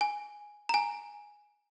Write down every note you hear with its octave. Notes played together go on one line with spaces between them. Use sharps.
G#5
A#5
G#5